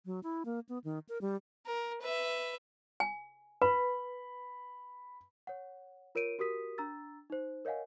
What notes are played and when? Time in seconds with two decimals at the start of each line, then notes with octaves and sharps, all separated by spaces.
0.06 F#3
0.23 E4
0.45 A#3
0.69 B3
0.84 D#3
1.09 A#4
1.21 G3
1.66 A#4
2.01 B4 E5
3.00 G#5
3.62 B4 B5
5.47 C#5 F#5
6.15 F4 A#4 C#5 D7 D#7
6.39 F#4 G4 A#4 D#6 B6 D#7
6.78 D4 A#5 E6 A6
7.30 D#4 C5
7.65 A#4 C#5 D#5 F5 F#5 G#5